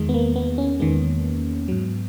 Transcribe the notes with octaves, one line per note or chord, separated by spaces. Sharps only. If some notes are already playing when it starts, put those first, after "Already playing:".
Already playing: E2 D#3 G#3
B3
A#3
B3
C#4
E2 D#3 G#3 B3
G#2 F#3